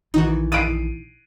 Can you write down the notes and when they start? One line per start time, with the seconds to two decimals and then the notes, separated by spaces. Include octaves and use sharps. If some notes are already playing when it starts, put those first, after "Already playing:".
0.14 A#1 D#3 E3 D#4 F#4
0.52 B5 D#6 A6 C7 D7 D#7